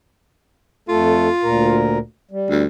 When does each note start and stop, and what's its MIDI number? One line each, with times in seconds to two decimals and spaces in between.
0.89 1.28 41
0.89 1.28 57
0.89 1.92 65
0.89 1.28 69
1.43 1.98 38
1.43 1.98 46
1.43 1.98 70
2.31 2.63 55
2.50 2.67 38